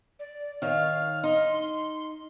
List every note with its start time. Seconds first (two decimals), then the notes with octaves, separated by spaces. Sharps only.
0.19 D5
0.62 D#3 C#5 F5 F6
1.24 D#4 C6